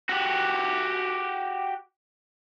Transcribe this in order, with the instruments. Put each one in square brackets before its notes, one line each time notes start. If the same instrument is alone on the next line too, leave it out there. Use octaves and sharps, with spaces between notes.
[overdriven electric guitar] F#4 G4